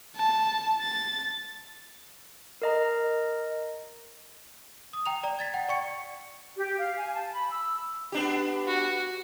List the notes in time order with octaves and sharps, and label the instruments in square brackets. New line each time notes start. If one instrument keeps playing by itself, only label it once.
[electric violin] A5
A6
[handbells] A#4 D#5 A#5
[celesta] D#6
G5 A#5 F7
D5 A#5
G#6 A6 B6
F#5 G5
D5 C#6 C#7
[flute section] G4
F5
G#5
A5
B5
E6
[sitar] B3 D4 G4
[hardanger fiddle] F#4